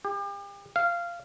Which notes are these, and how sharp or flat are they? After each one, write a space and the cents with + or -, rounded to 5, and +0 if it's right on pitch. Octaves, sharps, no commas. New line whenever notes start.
G4 +35
F5 -15